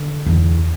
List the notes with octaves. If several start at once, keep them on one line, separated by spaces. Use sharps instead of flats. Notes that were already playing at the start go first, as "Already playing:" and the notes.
Already playing: D3
E2